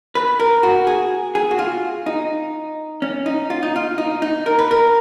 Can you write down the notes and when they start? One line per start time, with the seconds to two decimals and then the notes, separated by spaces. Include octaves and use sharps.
0.15 B4
0.40 A#4
0.63 F#4
0.87 G#4
1.35 G#4
1.51 F#4
1.59 F4
2.06 D#4
3.02 C#4
3.26 D#4
3.50 F4
3.63 D#4
3.76 F4
3.98 D#4
4.22 D#4
4.46 A#4
4.59 B4
4.71 A#4